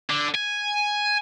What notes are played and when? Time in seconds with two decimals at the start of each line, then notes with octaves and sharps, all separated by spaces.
0.10 D3
0.35 G#5